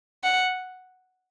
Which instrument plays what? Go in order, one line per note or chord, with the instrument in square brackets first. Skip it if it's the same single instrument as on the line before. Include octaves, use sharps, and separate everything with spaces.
[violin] F#5